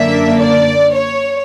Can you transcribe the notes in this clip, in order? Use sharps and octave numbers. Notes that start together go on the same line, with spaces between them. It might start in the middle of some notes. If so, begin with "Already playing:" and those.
Already playing: F#2 D3 A#3 D4 E5
D5
C#5